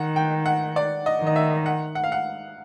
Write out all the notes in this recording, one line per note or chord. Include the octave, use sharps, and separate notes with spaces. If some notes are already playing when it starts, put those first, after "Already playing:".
Already playing: D#3 F#5
G5
F#5
D5
D#5
D#3
D#5
E5
F#5
F#5
F5
F#5